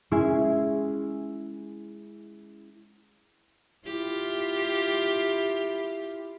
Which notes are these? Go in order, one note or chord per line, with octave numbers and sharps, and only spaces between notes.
G#3 C#4 E4 G#4
E4 F4 G4